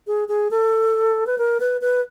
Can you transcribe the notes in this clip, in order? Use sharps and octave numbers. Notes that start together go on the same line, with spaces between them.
G#4
G#4
A4
B4
A#4
B4
B4